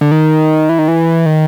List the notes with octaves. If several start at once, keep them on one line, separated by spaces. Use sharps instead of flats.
D3
D#3
E3
D#3
E3
D#3